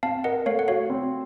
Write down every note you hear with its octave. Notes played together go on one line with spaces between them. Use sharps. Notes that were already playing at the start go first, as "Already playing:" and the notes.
C4 F5 A5
A#4 D#5 F#5
A3 C#5 F5
F#5
F#4 C#5 F5
C4